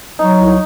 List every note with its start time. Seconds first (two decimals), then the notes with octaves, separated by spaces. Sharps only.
0.19 F#3 D#4
0.39 C2